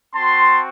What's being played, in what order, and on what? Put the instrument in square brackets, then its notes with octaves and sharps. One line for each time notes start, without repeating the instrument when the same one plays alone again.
[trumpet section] C4 F#4 A5 C6